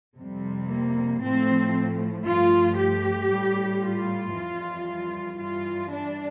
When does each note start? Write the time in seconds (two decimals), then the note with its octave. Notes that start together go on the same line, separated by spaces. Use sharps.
0.16 F2 C3 G3
0.68 A#3
1.20 A2 F3 A3 C4
2.25 G2 F3 A3 F4
2.78 G4
3.30 A2 G3
3.82 F4
4.34 F2 E3 G3
5.38 G2 E3 G3 F4
5.90 D4